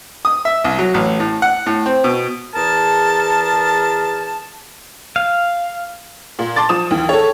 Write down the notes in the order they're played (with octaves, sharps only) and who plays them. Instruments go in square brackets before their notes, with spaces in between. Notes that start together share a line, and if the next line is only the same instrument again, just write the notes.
[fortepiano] D#6
E5
C2
F#3
A1
A2
F#5
A2
C4
B2
[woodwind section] E2 G#4 A#4 A5
[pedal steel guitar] F5
[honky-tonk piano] A#2
A5 C6 D6 A6
F3 D#6 E7
D#2 E3
A4 C#5